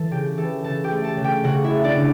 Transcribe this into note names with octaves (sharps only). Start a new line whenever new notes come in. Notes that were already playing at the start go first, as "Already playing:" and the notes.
Already playing: E3 A4 A5
C#3 G4 G5
E3 A4 A5
C#3 A4 A5
G4 G5
A3
A4 A5
C#3
G4 G5
C#3 F#4 F#5
E4 E5
A3
D4 D5
C#3